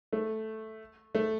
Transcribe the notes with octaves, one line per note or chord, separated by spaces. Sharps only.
A3
A3